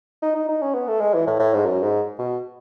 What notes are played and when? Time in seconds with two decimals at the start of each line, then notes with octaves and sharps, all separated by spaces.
0.22 D#4
0.35 D#4
0.49 D#4
0.62 C#4
0.74 B3
0.88 A3
1.01 G#3
1.14 E3
1.27 A2
1.39 A2
1.53 G#2
1.65 F#2
1.83 G#2
2.18 B2